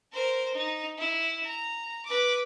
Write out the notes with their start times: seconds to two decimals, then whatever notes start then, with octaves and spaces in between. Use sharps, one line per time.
0.12 A#4 C5
0.54 D#4
0.98 E4
1.45 A#5
2.05 B4 D6